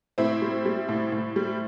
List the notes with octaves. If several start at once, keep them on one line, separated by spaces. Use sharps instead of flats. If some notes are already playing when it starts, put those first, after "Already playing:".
A2 C4 E4
G3
G3
A2
A2
G3